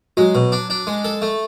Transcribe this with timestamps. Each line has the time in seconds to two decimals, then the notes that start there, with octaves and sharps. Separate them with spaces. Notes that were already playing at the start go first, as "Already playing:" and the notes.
0.17 F#3 G#3
0.35 B2
0.52 D4
0.70 D4
0.87 G#3
1.05 A4
1.22 A3